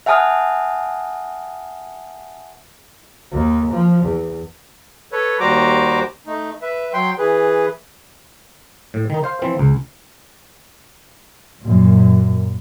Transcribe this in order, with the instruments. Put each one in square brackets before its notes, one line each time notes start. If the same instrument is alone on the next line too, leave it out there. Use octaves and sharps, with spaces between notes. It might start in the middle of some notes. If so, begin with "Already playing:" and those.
[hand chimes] E5 F#5 G#5 A5 D#6 F6
[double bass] D#2
F3
E2
[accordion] A4 B4 C#5
D#2 G3 F#4 C5 A#5 D6
A3 D#4
B4 E5
F#3 G5 C6
E3 G#4 B4
[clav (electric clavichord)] A2
D#3 D#4
C5 F5
E3 F3 C4
C#2
[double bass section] F#2 A#2